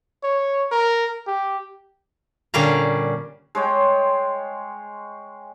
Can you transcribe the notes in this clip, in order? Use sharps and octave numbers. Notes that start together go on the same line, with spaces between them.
C#5
A#4
G4
A#2 D3 G3 C#4 F5 A#5
G#3 C#5 G5